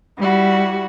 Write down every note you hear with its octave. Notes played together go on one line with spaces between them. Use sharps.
G3 E4 F#4